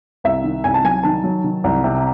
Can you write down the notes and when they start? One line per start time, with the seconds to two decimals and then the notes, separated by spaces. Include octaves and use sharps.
0.24 C2 E5
0.44 D#3
0.64 C2 G#5
0.74 A5
0.84 F#3 G#5
1.03 D#3 A5
1.24 F#3
1.44 D#3
1.64 C2
1.84 C3